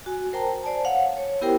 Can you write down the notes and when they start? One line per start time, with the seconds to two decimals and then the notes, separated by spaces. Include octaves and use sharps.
0.06 F#4 G#5
0.33 A#4 C5 G5 A5 A#5
0.63 C5 D5 G#5 A5
0.85 C#5 F5 F#5
1.17 C#5
1.41 B3 E4 G4 A#4 C5 G5